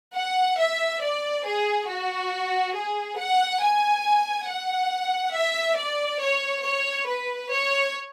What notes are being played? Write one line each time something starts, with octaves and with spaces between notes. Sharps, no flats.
F#5
E5
D5
G#4
F#4
G#4
F#5
G#5
F#5
E5
D5
C#5
C#5
B4
C#5